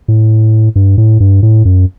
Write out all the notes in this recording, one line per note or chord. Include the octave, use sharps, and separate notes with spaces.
A2
G2
A2
G2
A2
F#2